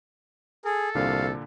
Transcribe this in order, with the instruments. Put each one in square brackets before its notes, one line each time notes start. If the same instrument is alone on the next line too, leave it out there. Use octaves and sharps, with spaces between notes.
[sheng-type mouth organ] G#4 [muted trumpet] A4
[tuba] C2 [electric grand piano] A#2 D3 D4 [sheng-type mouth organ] F5